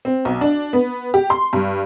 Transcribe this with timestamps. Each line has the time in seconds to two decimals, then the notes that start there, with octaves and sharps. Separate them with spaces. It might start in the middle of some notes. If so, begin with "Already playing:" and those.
0.05 C4
0.25 B1
0.41 D4
0.73 B3
1.14 G4
1.30 C6
1.53 G2